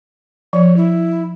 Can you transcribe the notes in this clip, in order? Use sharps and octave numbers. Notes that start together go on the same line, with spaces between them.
F3 C#5
E4